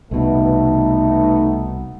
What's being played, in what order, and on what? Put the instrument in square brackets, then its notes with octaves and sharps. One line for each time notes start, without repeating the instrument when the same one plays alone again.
[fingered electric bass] C2 B2 [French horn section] A3 B3 D#4